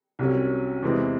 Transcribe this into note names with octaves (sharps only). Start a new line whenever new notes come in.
C2 C3 F#3 C#4
E2 C3 E3 G#3 C4